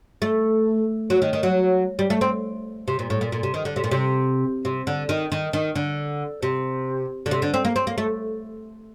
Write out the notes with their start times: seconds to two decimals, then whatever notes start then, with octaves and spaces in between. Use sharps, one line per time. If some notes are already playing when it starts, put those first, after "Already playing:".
0.22 A3
1.10 F#3
1.22 D#3
1.33 D#3
1.43 F#3
1.99 G3
2.10 A3
2.21 C4
2.88 C3
2.99 A#2
3.10 A2
3.21 A#2
3.32 A#2
3.43 C3
3.54 D#3
3.65 D3
3.76 C3
3.84 A#2
3.91 C3
4.65 C3
4.87 D3
5.09 D#3
5.32 D#3
5.53 D#3
5.75 D3
6.42 C3
7.26 D3
7.31 C3
7.42 D3
7.54 C4
7.65 A#3
7.76 C4
7.87 A#3
7.98 A3